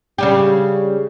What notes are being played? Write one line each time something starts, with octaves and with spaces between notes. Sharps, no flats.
C#3 G3 G4